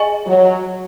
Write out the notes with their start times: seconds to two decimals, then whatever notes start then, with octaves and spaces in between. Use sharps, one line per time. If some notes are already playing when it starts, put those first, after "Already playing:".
Already playing: G#4 D#5 G#5 C#6
0.26 F#3